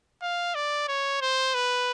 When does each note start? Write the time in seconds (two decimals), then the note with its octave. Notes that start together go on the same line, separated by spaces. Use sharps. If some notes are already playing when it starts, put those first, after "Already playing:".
0.22 F5
0.55 D5
0.88 C#5
1.21 C5
1.55 B4